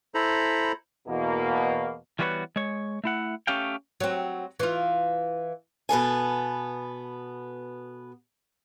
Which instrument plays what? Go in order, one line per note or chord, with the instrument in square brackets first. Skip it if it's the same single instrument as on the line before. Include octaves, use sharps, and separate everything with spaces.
[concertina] E4 A4 C5 A#5 B5
[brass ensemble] E2 B2 A#3
[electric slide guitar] E3 G3 B3 F#4 B4 C#5
G#3 C#5
A3 E4 F#5
A3 C#4 G4 F5 G5
[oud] F#3 C4
E3 F4
[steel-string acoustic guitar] B2 B3 A4 G#5